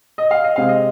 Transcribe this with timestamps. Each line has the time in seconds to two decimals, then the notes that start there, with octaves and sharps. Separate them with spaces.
0.18 D#5
0.31 F5
0.44 D#5
0.56 C3 G#3 C4 F5
0.69 D#5